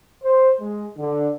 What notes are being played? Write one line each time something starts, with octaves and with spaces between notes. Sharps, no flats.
C5
G#3
D3